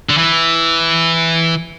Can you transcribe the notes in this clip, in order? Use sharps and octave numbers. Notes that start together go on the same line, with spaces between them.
D3
E3